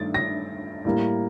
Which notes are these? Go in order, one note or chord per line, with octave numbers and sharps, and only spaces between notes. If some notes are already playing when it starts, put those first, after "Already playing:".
Already playing: G2 D#3 A3 D4 A6
A#6
A2 G3 A#3